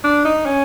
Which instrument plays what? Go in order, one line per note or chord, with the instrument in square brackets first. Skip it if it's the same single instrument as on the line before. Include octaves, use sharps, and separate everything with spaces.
[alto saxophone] D4
D#4
C#4